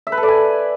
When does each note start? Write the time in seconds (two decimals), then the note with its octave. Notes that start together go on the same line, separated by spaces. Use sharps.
0.07 E5
0.12 B4
0.18 A4
0.23 D5
0.28 G#5